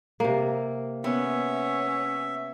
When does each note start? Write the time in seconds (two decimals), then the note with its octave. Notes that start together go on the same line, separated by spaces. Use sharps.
0.20 C3 A#3
1.04 B3 C#4 E5